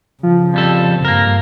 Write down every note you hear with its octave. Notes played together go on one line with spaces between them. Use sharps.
C#3 F3
F2 G3 A4
G2 A#3 A#4